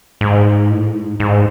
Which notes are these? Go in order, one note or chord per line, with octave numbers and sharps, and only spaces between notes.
G#2
A2
G#2
G#2